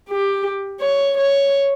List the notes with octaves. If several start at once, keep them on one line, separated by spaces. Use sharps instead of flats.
G4
C#5
C#5